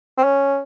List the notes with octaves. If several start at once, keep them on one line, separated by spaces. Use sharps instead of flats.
C4
C#4